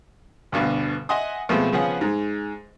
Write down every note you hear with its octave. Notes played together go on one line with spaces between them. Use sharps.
D2 G2 B2 D3
D#5 E5 F#5 G#5 C6 D#6
B2 F3 G#3 A3 B3 C4
C#3 F3 B3 C#4 G#4 F#5
G#2 G#3